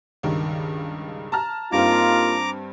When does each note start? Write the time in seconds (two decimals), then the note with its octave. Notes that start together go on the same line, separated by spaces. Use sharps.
0.23 C#2 G2 D#3
1.32 A5 A#5 F6
1.72 G2 A#3 C4 D#4 F4 A#5 D6